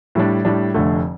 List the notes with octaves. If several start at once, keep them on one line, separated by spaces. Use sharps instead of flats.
A2 G3 D4
A2 G3 D4
F1 F2 D3 A3